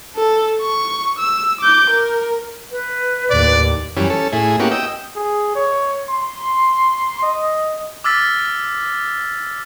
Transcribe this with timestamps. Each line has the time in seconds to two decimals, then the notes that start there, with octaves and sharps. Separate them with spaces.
0.16 A4
0.62 C#6
1.19 E6
1.61 D6 G6
1.90 A#4
2.71 B4
3.30 D#2 A2 D5
3.97 F#2 E3 G3 C#4
4.10 C#4 A4
4.32 A2 E4 G#4
4.60 A#3 B3 C#4 E4 F#4 G4
4.71 D#5 G5 E6
5.16 G#4
5.55 C#5
6.10 C6
7.23 D#5
8.04 D6 E6 F6 A6 B6